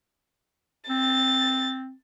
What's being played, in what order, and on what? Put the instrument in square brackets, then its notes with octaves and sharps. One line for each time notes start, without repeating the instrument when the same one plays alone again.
[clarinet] C4 [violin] A6